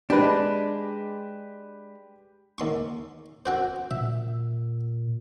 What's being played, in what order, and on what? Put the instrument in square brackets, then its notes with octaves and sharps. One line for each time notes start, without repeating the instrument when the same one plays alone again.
[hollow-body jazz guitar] G#3 D4 [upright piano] G4 B4
[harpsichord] D#2 C6 C#6
C4 F#4 C5
[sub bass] A#2 [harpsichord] E5